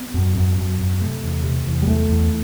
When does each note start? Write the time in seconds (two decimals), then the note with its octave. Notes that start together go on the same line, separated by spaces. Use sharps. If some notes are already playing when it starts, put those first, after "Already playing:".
Already playing: B3
0.14 F#2
0.36 F#2
0.57 F#2
0.79 F#2
1.00 C3 A3
1.23 E2
1.44 C3
1.66 E2
1.82 G3
1.87 E2 A3
2.09 E2